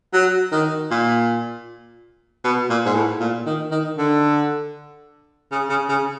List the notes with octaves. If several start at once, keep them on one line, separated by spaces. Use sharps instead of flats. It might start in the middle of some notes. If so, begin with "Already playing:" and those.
F#3
D#3
A#2
B2
A#2
G#2
A2
A#2
D#3
D#3
D3
C#3
C#3
C#3